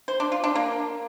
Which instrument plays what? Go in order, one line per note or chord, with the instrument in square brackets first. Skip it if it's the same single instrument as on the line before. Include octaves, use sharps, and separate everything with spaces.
[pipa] C5
D4
F4
D4
A#3